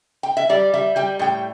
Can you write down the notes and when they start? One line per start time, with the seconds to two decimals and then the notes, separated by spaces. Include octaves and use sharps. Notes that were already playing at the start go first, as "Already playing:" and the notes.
0.23 G5
0.37 E5
0.49 G3 D5
0.74 G3 E5
0.96 G3 G5
1.19 A2 G5